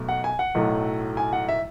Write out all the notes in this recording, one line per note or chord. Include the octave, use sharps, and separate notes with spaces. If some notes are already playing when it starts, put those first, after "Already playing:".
Already playing: B1 B2 A3
F#5
G#5
F#5
B1 A2 F#3 A3
G#5
F#5
E5